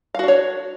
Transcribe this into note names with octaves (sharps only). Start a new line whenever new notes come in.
D4 F#4 C#5 F5